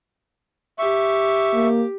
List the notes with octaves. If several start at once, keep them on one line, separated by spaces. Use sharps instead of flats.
G4 E5 C#6
A#3